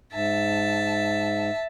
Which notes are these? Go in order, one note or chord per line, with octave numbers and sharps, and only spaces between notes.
G#2 E5 A5